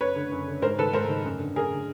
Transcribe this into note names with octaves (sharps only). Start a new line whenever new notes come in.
F#2 B4 C#5
D3
F#2
D3
G#2 A#4 C5
D#3 A4 B4
G#2 A#4 C5
D#3
F#2
D3
F#2 G#4 A#4
D3